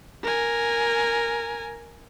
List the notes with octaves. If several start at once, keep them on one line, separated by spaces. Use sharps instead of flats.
A#4 G#5